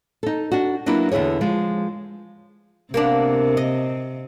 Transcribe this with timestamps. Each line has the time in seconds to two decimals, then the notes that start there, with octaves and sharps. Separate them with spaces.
0.23 D#4 A4
0.52 D4 F#4
0.86 F#3 A#3 B3 D4 E4
1.12 E2 D3 E4 G#4 C#5
1.41 F3 G#3
2.94 C3 A#3 B3 D4
3.57 D#5